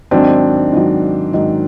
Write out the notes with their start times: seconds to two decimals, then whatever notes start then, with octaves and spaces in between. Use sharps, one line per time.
0.11 G#2 D#3 F#3 C4 D4
0.72 G#2 D#3 F#3
1.34 G#2 D#3 F#3